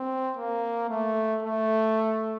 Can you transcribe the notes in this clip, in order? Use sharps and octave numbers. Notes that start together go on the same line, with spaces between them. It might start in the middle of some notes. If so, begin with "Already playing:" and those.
Already playing: C4
A#3
A3
A3